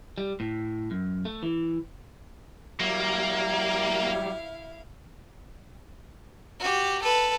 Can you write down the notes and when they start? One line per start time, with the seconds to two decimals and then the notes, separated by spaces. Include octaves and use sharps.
0.18 G3
0.40 A2
0.91 F#2
1.25 A3
1.43 E3
2.80 F#3 G3 A#3 E4 F5
6.60 F#4 G4
7.03 A4 B4